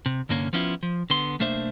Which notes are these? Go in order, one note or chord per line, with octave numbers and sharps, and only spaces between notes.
C3
C2 G2 D3 A#3 C#4
F3 B3 C#4 D4 E4 F4
F3
D3 B3 C6
B1 A3 A#3 D4 C5 E5